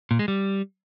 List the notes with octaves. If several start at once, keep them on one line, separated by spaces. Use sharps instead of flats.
A#2
G#3
G3